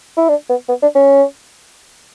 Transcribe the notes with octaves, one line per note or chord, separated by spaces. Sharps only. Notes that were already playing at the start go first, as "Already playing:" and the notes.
E4
D4
B3
B3
D4
C#4